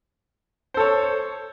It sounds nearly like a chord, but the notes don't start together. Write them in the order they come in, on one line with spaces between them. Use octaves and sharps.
C5 A4 C#5